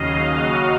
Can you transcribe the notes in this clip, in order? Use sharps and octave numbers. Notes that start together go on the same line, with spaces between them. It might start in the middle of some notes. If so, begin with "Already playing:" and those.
Already playing: D#2 C#3 F#3 D#5 F5
F#4